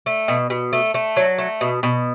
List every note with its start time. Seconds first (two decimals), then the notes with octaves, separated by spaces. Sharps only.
0.06 A3
0.28 B2
0.50 B2
0.73 A3
0.94 A3
1.17 F#3
1.38 A3
1.61 B2
1.83 B2